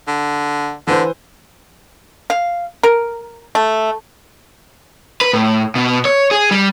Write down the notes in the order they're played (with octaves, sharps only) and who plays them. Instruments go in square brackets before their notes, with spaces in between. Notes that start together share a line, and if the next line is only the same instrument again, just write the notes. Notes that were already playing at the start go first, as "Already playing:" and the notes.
[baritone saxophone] D3
[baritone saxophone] D3 [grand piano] E3 B4 C5
[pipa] F5
A#4
A3
[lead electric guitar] B4
A2
B2
C#5
G#4
G3